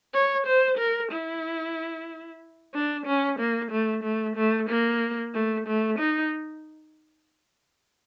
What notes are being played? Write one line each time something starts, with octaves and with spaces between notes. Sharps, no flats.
C#5
C5
A#4
E4
D4
C#4
A#3
A3
A3
A3
A#3
A3
A3
D#4